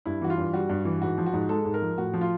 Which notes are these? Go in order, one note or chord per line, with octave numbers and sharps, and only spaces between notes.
G2 E4
E3 F#4
F4
G2
G3 F#4
G2
E3
G#2 F#4
F3
F#4
G#2
G#3 A4
G#2
A#4
F3
A2 F#4
F3
F4